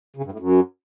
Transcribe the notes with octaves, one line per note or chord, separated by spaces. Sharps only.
C#3
G2
A2
F#2